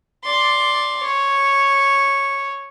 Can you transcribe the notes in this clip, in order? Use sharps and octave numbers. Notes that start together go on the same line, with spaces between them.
D5 C6
C#5